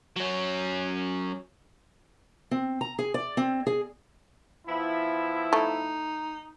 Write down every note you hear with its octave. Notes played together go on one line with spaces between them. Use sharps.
F#3 C#4
C4
A#5
G#4
D5
C4
G#4
F3 B3 E4
A3 D#4